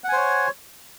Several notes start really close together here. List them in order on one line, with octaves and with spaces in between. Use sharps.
F#5 G#5 C5 C#5